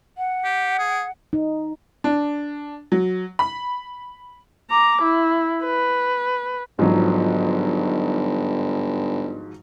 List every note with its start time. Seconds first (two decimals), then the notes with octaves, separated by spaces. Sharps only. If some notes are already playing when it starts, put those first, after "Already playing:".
0.18 F#5
0.44 G4
0.79 G#4
1.33 D#4
2.04 D4
2.92 F#3
3.39 B5
4.71 A#5 D6
5.02 E4
5.64 B4
6.79 G1 G#2 F3 F#3